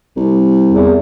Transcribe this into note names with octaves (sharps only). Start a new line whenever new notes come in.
C2
E2